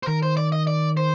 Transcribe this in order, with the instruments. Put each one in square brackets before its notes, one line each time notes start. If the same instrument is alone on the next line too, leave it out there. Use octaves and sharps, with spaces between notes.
[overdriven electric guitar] C5
[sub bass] D#3 [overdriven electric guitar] A#4
[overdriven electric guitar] C5
D5
D#5
D5
C5